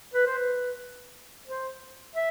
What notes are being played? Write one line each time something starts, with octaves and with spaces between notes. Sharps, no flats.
B4
C5
B4
C5
E5